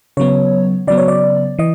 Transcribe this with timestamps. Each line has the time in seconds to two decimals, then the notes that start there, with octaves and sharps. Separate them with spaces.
0.17 C#3 F#3 B3 C#5
0.87 C#3 F#3 B3 D5
0.98 C#5
1.08 D5
1.59 E3 D#5